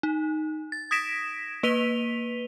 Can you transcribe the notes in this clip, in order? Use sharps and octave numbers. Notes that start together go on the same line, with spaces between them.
D#4
A6
D#6 G#6 A#6 B6 D7 E7
A#3 B4 B6 D#7 F7 G7